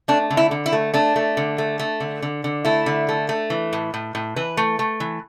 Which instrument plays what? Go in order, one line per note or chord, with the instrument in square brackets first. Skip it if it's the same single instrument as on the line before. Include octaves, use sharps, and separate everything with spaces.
[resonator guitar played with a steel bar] A3 D4
D3
E4
D3
E4
A3
A3 D4
A3
D3
A3
A3
D3
D3
D3
A3 E4
D3
A3
A3
E3
A2
A2
A2
E3 B4
A3
A3
E3